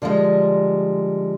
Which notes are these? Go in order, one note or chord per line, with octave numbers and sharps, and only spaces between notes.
D3 F3 G3 G#3